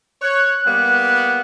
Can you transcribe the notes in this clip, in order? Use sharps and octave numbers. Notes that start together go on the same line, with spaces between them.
C#5 F#6
G3 A#3 B3